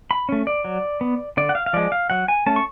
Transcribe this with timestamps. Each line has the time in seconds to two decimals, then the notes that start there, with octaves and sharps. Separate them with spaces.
0.11 B5
0.29 A3 C#4
0.47 D5
0.65 F#3
1.01 B3
1.37 D3 D5
1.49 F#5
1.55 F5
1.66 F5
1.73 F3 G#3 D5
1.92 F5
2.10 F#3 F#5
2.28 G#5
2.46 A3 C#4 A5
2.56 C#6